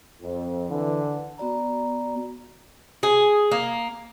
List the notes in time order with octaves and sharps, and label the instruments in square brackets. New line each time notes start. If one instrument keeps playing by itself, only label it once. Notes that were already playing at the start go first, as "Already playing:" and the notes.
[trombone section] F2
[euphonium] D3 [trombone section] E3
[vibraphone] B3 F#4 D5 A#5
[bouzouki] G#4
A#3